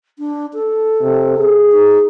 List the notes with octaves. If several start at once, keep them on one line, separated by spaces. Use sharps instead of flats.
D4
A4
C3
G#4
D#4